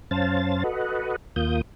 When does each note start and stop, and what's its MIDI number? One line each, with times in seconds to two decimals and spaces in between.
0.11 0.63 42
0.11 0.63 61
0.11 0.63 72
0.11 0.63 77
0.11 0.63 81
0.11 0.63 93
0.64 1.16 66
0.64 1.16 69
0.64 1.16 71
0.64 1.16 75
0.64 1.16 78
1.36 1.61 39
1.36 1.61 58
1.36 1.61 65
1.36 1.61 87
1.36 1.61 91